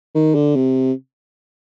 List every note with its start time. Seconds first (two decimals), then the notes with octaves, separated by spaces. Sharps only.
0.15 D#3
0.35 D3
0.55 C3